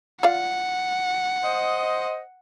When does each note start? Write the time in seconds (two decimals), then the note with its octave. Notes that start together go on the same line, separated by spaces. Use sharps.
0.23 F4 D5 F5 F#5
1.43 C5 D#5